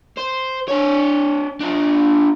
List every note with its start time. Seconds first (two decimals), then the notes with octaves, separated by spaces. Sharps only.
0.18 C5
0.68 D4 C#5
1.60 D4 F4